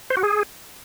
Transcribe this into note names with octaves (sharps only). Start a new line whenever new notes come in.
C5
F#4
G#4